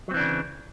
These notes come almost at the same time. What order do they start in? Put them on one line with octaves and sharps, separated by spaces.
F#3 C4 E3 D4 C#3